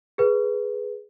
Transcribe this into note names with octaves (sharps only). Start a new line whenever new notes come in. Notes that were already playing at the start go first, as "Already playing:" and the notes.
G#4 B4